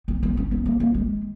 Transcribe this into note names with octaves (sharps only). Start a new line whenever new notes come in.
B3
B3
C#4
B3
A#3
A#3
G#3